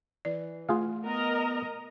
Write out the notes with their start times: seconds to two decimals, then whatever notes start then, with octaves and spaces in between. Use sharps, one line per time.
0.25 E3 D5
0.69 A3 F4 G#4 F5
1.05 B3 A#4 D#5 A#5